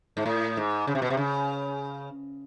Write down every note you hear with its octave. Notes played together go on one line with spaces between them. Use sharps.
G#2
A2
G#2
C#3
C3
B2
C3
C#3